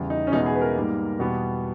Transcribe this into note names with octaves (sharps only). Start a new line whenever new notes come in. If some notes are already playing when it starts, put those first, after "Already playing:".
Already playing: E2 C#3 G3
D#4
C#4
E2 B2 G#3 B3 D#4
G#4
B4
A#4
G#2 G3 A#3
E2 B2 G3 B3